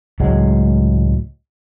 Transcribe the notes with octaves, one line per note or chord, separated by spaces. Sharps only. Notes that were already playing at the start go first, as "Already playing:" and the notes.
C#2 A2 F#3 G#3